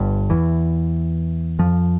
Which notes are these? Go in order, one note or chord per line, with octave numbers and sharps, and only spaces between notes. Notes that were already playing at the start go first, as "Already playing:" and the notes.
Already playing: G1 G2
E2 E3
F2 F3